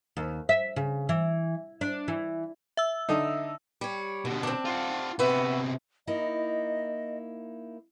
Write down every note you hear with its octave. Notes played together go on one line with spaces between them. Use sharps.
D#2
E5
C#3
E3
D4
E3
E5 E6
D3 D#4
G3 C#5
D#2 B2 D3
C4 D4
F4 F#5
C3 B3 F#4 B4 E5
A#3 D#4 E4 D#5